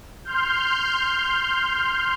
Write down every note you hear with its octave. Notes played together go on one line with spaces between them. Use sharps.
C6 F6 G6